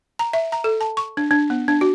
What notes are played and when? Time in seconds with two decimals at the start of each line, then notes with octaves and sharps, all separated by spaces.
0.19 A#5
0.33 E5
0.52 A#5
0.64 A4
0.81 A5
0.97 C#6
1.17 D4
1.31 D4
1.50 B3
1.68 D4
1.81 F#4